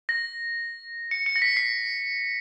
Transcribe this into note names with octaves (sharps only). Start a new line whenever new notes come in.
A#6
C#7
C#7
A#6
B6
C7